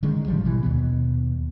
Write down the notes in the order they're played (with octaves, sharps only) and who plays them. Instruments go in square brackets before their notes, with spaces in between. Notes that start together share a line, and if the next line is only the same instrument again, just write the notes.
[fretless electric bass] D3 D#3 G#3 C#4
A1 F3 G3
B2 E3 G3
D#2 B2 B3